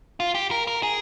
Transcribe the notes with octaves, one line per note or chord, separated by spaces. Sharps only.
F4
G4
A#4
A#4
G#4